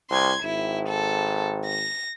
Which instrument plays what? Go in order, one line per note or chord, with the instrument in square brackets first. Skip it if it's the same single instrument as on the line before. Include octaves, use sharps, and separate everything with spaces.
[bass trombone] C2 [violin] C6 G#6
[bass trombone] G#1 [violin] E4
[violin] A4
A#6